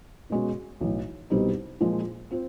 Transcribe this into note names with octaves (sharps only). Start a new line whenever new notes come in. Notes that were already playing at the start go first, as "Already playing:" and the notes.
B2 G#3 C#4 F#4
B1 A2 E3
C2 B2 G3 C4 D#4
A#2 F3 G#3
C4 F4